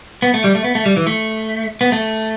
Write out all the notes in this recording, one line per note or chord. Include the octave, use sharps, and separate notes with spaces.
B3
A3
G3
A3
B3
A3
G3
E3
A3
B3
A3